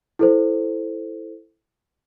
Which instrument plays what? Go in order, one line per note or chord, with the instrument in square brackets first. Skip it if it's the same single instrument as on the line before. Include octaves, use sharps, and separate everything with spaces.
[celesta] E4 A4 C5